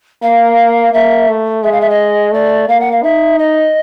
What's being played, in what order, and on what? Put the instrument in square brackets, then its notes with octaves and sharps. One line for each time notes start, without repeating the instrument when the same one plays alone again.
[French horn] A#3 [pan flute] F5
[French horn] A#3 [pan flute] E5
[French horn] A3
[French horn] G#3 [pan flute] E5
[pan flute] F5
E5
D#5
[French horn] A3 [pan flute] D5
[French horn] A#3 [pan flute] F5
[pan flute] F#5
F5
[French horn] D#4 [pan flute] E5
[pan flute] D#5